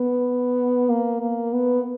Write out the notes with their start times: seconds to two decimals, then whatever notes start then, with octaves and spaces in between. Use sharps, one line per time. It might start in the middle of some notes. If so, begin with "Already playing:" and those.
Already playing: B3
0.89 A#3
1.21 A#3
1.53 B3